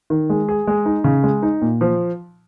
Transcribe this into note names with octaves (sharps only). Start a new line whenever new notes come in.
D#3
G#3
G#4
G#3
D#4
C#3
G#3
D#4
A#2
F3